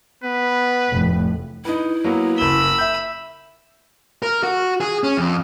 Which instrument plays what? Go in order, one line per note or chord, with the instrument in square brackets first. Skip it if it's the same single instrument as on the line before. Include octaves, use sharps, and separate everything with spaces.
[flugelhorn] B3 [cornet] B4
[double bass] F1 A2
[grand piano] D#4 B4 [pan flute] E4
[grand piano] F#3 A#3 B3
[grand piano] F#1 G7 [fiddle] B5 E6
[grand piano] E5 G6
[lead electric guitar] A#4
F#4
G#4
C#4
F2